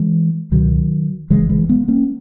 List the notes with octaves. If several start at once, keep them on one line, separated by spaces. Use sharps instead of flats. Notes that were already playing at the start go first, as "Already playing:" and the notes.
Already playing: E3 G#3
C#2 B2 D#3 F#3
F#1 F#2 C#3 E3 G#3
E3 G#3
G#3 B3
A#3 C#4